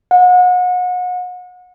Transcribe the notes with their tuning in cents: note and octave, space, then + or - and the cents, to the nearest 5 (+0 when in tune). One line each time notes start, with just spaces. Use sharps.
F#5 -35